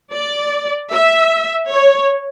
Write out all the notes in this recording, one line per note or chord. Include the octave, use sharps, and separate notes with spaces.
D5
E5
C#5